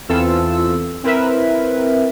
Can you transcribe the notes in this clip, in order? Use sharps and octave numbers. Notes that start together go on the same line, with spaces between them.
E2 E3 C4 F4 A4 E6
C4 E4 A#4 B4 E5